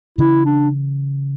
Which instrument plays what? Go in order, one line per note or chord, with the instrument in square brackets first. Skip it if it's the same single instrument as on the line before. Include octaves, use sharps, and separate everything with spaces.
[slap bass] C#3 E3 [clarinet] E4
[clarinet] D4